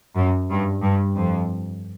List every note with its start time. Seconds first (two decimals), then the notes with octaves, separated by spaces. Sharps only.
0.15 F#2
0.49 G2
0.82 G2
1.16 F2